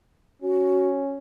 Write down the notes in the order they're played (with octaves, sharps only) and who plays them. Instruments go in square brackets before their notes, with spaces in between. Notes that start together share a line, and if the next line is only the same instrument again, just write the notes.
[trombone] C#4 [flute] F#4